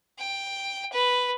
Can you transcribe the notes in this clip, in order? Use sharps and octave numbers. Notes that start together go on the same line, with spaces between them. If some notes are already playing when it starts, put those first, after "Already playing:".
G5
B4